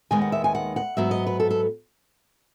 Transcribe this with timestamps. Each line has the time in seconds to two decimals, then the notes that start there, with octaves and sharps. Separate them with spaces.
0.11 D#2 D#3 G#3 B3 G#5
0.22 F#5
0.32 E5
0.44 G#5
0.55 F#5
0.76 F#5
0.97 G#2 F#3 B3 E5
1.11 D#5
1.27 B4
1.40 A4
1.51 A4